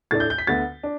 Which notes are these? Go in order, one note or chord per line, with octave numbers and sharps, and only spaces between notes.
A2 A3 D4 A6
G6
G6
B6
D2 D3 B3 A6
D4